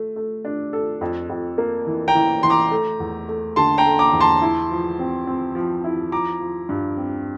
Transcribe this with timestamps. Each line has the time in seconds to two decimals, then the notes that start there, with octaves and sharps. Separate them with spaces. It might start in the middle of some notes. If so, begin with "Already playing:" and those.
Already playing: A3
0.16 A3
0.45 D4
0.73 A4
1.01 F2
1.29 F2
1.58 A#3
1.87 E3
2.08 G5 A#5
2.15 E3
2.43 E3 C6
2.50 A#5 D6
2.71 A3
3.00 E2
3.29 A3
3.56 D3 A5 C6
3.78 G5 A#5
3.85 A3
3.99 A#5 D6
4.13 E2
4.20 A5 C6
4.42 E4
4.71 F3
4.99 C4
5.27 C4
5.55 F3
5.84 E4
6.12 F3 A#5 D6
6.40 F3
6.69 G2
6.97 C4